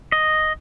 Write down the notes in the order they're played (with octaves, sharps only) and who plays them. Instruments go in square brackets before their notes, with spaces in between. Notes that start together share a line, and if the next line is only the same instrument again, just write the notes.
[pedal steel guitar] D#5